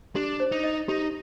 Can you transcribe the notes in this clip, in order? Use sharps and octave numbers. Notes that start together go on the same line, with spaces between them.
D4 G4
C5
D#4
D#5
D#4 G4